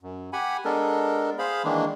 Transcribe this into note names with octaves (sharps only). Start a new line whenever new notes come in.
F#2
G4 F#5 G#5 B5
G#3 B3 D4 A4 A#4
G#4 C5 F5 B5
D#3 E3 G#3 A#3 D4